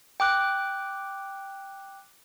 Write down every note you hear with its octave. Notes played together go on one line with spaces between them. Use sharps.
G5 D6 F#6